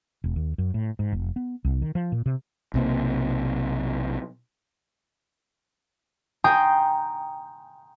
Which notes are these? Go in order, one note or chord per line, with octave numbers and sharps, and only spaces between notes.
E1
D#2
F#2
A2
G#2
F1
B3
C2
D#3
F3
A#2
C3
B1 C3 A#3
G5 G#5 A#5 C6 D#6 G6